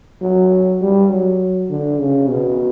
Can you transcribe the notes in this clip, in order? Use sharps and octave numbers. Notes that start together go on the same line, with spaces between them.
F#3
G3
F#3
D3
C#3
B2